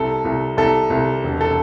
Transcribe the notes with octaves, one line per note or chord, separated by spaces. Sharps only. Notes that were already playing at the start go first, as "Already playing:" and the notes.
Already playing: C2 A4
C2
C2 A4
C2
E1
A4